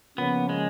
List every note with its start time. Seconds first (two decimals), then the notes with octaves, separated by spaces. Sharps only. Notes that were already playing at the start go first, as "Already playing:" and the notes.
0.17 C#3 F3 A#3 B3 C#4
0.49 G#3